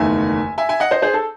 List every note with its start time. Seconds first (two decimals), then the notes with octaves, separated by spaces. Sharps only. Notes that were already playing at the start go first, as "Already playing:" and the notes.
Already playing: F#1 E2 D#3 A3 E5 G#5
0.58 E5 G#5
0.69 E5 G#5
0.80 D#5 F#5
0.91 C5 D#5
1.02 G#4 C5
1.14 A4